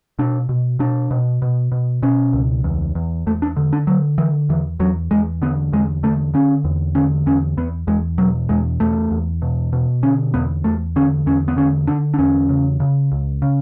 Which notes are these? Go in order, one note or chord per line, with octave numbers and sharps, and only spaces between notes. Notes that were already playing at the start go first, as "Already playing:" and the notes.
B2 D4
B2
B2 D4
B2
B2
B2
B2 C#4
C#2
E2
E2
E2 A3
D4
D3
D4
D3 F#3
D3 E3
E2 E3
E2 F#3
E2 G#3
D3 B3
E2 G#3
D3 A3
D3 C#4
E2
D3 C#4
E2 C#4
E2 B3
E2 G#3
B2 F#3
E2 G#3
E2 A3
E2
B2
B2
D3 C#4
E2 B3
E2 A3
D3 C#4
E2 C#4
B3
D3 C#4
D3 D4
D4
E2 C#4
C#3
C#3
C#2
C#3